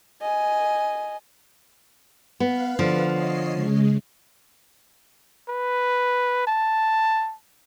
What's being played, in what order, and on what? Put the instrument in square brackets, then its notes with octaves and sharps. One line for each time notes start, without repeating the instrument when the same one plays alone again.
[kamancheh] D#5 G#5
[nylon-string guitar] B3 [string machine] B4 F5
[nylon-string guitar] D3 F3
[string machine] C#5 D#5 C7
C#3 G#3
[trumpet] B4
A5